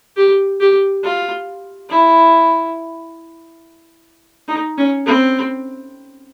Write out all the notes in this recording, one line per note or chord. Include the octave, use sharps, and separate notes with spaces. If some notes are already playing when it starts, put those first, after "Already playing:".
G4
G4
F4
E4
D#4
C#4
C4